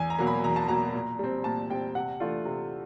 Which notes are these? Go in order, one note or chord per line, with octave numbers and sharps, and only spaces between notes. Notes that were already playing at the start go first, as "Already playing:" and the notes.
Already playing: E2 G#5
A#5
B2 F#3 A#3
B5
E2 A#5
A5
B2 F#3 A#3 A#5
A#2
G3 C4
A#2 A5
G3 C4 G5
C3 F#5
E3 A3 D4 F4
C3